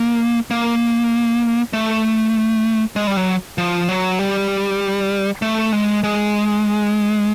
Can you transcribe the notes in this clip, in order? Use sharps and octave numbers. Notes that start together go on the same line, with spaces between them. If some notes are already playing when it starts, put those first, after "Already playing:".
Already playing: A#3
A#3
A3
G#3
G3
F#3
F3
F#3
G3
A3
G#3
G#3